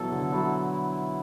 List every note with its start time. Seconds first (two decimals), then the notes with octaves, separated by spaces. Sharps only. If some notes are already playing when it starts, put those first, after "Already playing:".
Already playing: B2 E3 F#3 A4
0.12 D3
0.32 F#3 E4
0.73 E4